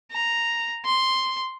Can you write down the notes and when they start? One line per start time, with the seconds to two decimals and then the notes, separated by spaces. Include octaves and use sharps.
0.12 A#5
0.85 C6